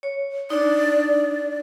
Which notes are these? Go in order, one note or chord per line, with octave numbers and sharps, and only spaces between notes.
C#5
D4 D#4 D5